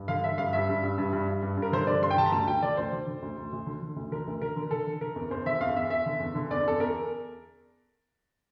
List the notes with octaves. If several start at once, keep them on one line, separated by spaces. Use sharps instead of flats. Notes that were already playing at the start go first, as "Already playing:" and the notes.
Already playing: G2
D3 F5
D3 E5
G2 F5
G2 E5
G2
G2
G2
G2
G2
G2
G2
A#4
D3 C5
D3 D5
G2 C6
G5
D3 A5
A#5
D2 A5
D2 G5
D3 D5
D2 C5
D3
D3
D2
D2
D2
D3
D3
D2
D3 A#4
D2
D3 A#4
D3
D3 A4
D3
D3 A#4
E2
E2 C5
D3 E5
E2 F5
E2 E5
E2 E5
D3
E2
D3
E2 D5
E2 A4
E2 A#4